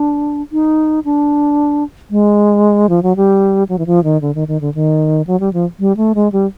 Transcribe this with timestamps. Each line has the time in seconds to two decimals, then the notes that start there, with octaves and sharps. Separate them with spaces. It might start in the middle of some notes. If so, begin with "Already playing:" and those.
Already playing: D4
0.52 D#4
1.05 D4
2.11 G#3
2.89 F3
3.03 F#3
3.16 G3
3.69 F#3
3.79 E3
3.86 F3
4.04 D#3
4.21 D3
4.35 D#3
4.48 D#3
4.61 D3
4.74 D#3
5.27 F#3
5.40 G3
5.53 F3
5.80 G3
5.97 A3
6.15 G#3
6.32 G3